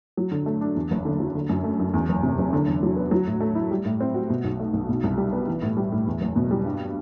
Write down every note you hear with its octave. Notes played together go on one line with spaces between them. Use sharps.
F#3
D3
A3
D4
E2
F#1
D3
F#3
D3
F#2
A3
F#2
E2
F#1
C3
F#1
D3
E2
F#3
B3
F#3
A2
A3
E4
G3
A2
C4
F#4
B2
B1
A3
B1
B2
C2
G3
B3
E3
A2
G3
A2
E2
F#1
B2
G3
G2